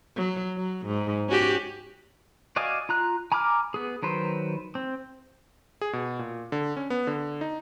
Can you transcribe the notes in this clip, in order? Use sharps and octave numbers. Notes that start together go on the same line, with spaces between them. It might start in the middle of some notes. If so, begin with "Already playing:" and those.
F#3
F#3
G#2
C#4 F#4 G4
F#4 D5 D#5 F5 G#5
F4 A#5 F#6
G#5 A#5 B5 D6 F6
B3 G#4
D#3 F#3 B4 C5
C4
G#4
B2
A#2
D3
C#4
B3
D3
D#4